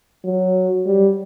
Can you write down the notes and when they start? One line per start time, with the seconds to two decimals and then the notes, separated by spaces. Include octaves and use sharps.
0.24 F#3
0.86 G3